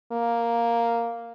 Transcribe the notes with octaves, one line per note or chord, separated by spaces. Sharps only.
A#3